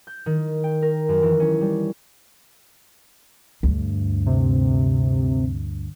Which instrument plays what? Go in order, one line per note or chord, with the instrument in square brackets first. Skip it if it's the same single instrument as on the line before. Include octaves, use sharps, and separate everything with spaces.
[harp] G6
D#3
G5
A#4
F#2
E3
C#4
G3
[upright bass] D2 G2
[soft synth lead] C3